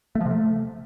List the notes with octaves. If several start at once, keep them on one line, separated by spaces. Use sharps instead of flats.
A3
F3
C3
A3